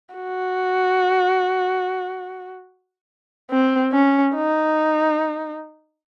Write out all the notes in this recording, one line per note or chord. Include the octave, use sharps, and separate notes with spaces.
F#4
C4
C#4
D#4